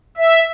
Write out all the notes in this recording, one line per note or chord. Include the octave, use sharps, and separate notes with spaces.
E5